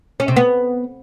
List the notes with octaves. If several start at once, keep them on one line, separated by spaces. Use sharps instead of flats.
C#4
C3
B3